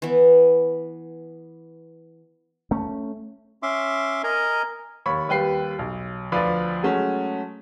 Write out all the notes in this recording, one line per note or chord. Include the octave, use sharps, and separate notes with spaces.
E3 B3
A3 C#4
C#4 E5 C6 D6
A#4 D#5 G#5 A#5
D#2 C#5 B5 C#6
D#2 G3 B4 G5 C7
B1
D2 F3 B4 D5 F5 B5
F#3 G#3 A3 C#4 F#4 G#4